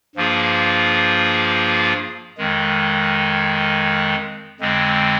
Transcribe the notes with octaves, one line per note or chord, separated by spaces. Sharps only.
G2 F3 A#3 F4 G#4
F2 D#3 G#3
F2 D3 G#3 C4